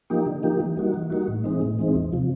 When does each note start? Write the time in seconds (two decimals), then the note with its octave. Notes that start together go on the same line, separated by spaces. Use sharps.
0.10 F3 A#3 D#4 G4
0.26 D3
0.43 F3 A#3 D#4 G4
0.60 E3
0.77 G3 A#3 D#4 F#4
0.94 E3
1.10 G3 A#3 D#4 F#4
1.28 A2
1.44 E3 G#3 C4 D#4
1.62 A2
1.79 E3 G#3 C4 D#4
1.95 E2
2.12 C3 F3